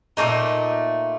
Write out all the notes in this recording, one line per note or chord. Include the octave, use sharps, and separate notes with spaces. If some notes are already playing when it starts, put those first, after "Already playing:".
A#2 A3 A#3 D#4